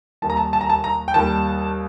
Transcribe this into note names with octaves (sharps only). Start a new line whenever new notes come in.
D#2 D#3 G3 A5
A#5
A5
A5
A#5
A5
A#5
G5
D#2 D#3 G3 A5